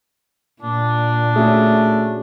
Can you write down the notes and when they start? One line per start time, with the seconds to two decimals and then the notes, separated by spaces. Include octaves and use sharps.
0.62 A#2 D4
1.36 A3 C#4 F#4 G#4